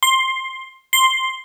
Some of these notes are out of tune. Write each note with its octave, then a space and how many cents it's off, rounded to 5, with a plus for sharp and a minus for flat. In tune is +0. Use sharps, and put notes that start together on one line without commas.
C6 +10
C6 +0